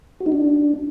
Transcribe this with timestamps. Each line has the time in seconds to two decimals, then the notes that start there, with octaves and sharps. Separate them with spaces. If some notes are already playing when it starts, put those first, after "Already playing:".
0.20 F#4
0.26 D#4
0.32 D4